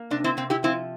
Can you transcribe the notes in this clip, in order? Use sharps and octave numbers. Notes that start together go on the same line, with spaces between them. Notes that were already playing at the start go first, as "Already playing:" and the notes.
Already playing: A#3
C3 D4
C4 E4
C3 C4
E4 G4
F3 C4 E4